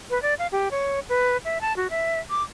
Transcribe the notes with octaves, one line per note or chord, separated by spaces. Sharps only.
B4
D5
F5
G4
C#5
B4
E5
A5
F#4
E5
D6